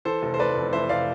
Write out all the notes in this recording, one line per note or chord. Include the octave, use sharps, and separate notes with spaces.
E3 A4 C5
F1
C5
A3 B4 D5
F2
E3 C5 E5
F1 D5 F5